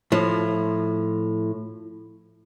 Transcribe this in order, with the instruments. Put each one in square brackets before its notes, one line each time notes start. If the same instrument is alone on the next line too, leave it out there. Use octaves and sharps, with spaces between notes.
[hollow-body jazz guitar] A2 F3